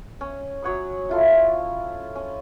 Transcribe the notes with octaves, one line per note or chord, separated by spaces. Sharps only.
C#4
F#3 C#5 F#5 D#6
E4 F4 A4
C#4